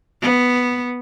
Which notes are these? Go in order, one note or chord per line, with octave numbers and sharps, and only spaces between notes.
B3